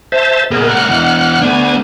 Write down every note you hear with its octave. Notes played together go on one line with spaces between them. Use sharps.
C5 E5 A5
A#2 B3 G#4 A#4
A2 A#4 F#5 F6 F#6
B2 E3
A3 B3 D4 G#5